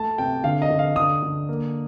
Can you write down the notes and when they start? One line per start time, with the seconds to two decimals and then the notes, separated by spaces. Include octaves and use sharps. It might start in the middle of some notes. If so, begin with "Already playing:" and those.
Already playing: A3 A5
0.18 C3 G5
0.44 D3 F5
0.62 D#5
0.70 D3
0.79 F5
0.96 D3 D#6
1.22 D3
1.49 A#3